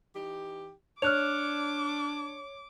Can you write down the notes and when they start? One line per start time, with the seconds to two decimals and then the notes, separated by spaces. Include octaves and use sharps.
0.14 E3 D#4 G4
1.02 D4 C#5 D6 F6 F#6 F7